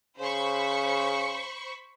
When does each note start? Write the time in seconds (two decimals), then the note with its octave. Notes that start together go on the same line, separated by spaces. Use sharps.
0.19 C#3 C5 B5 C#6